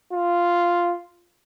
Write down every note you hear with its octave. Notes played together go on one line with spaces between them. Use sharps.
F4